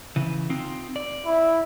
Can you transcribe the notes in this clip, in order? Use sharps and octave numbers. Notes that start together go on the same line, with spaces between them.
C#3 E3
C4 D#4 F4
D5
E4